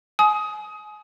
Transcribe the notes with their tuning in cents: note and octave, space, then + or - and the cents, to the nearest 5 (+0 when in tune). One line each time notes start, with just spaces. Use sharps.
G#5 +35 D#6 +15